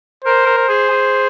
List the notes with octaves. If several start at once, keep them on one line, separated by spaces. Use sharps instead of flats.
A#4 C5
A#4
C5
G#4
G#4